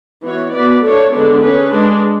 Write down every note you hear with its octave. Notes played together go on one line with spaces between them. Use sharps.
E3 B3 F#4 C#5
B3 F#4 B4 D5
A3 D4 A4 C#5
D3 G#3 B3 D4
C#4 G#4 B4
G#3 D4 G#4